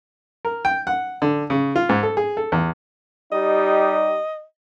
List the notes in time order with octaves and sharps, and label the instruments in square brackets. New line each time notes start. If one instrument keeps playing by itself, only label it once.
[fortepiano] A#4
G5
F#5
D3
C#3
F4
G#2
A4
G#4
A4
E2
[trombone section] G3 D#4 G4 [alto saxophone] D#5